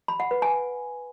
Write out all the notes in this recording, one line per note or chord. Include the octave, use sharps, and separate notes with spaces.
B5
F#5
B4
G#5